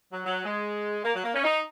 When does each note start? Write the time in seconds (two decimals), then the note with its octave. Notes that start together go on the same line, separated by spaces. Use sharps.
0.12 F#3
0.25 F#3
0.45 G#3
1.04 A#3
1.15 F#3
1.24 A#3
1.34 C#4
1.44 D#4